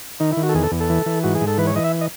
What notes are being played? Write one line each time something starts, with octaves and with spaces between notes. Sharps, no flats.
D#3 D#4
E4
D#3
F#4
A4
E2 G#4
A4
E2
A4
E3
E3
G#2 F#4
G#4
G#2
A4
E3 B4
C#5
E3 D#5
E5
D#5